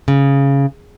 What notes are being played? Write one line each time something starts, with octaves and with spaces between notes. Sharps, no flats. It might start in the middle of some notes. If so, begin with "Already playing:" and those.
C#3